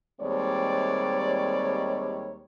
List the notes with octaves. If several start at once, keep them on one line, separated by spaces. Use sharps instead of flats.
D#2 G3 G#3 C4 C#5 D5